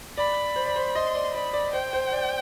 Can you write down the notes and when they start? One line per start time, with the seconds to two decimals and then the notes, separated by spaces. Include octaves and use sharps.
0.17 D5 B5
0.56 C5
0.66 D5
0.76 C5
0.95 D#5 C6
1.15 D5
1.34 D5 B5
1.53 D5
1.73 C5 G5
1.93 C5
2.12 D5